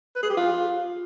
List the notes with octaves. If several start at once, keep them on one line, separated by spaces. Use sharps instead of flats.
B4
G#4
G4
F4